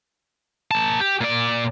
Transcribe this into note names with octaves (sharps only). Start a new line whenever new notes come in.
A#3 A5
G4
A#2 D5